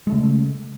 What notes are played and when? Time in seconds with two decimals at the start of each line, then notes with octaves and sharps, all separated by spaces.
0.07 G#3
0.09 A3
0.12 C#3